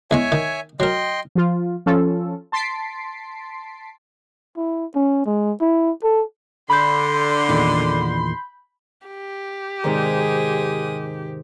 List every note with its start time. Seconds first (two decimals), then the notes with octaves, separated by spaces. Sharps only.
0.11 E2 G#3 C#5 E5 G#5 C#6
0.32 D#3
0.80 F#3 A#4 D#5 G5 C6
1.35 F3 F4
1.86 F3 C#4 F4 A4
2.52 A5 C6 A6 B6 C7 D7
4.57 E4
4.95 C#4
5.26 G#3
5.61 E4
6.03 A4
6.70 D3 B5 C6 G6
7.48 E2 A#2 D#3
9.07 G4
9.84 G#2 C3 D#3 G#3 D#6